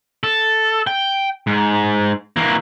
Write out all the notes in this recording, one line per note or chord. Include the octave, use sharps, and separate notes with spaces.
A4
G5
G#2
E3 A#3